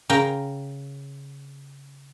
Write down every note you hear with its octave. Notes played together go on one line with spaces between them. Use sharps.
C#3 A#4 G5